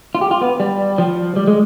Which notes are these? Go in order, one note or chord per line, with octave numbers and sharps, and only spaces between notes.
F4
G4
F4
B3
G3
F3
G3
G#3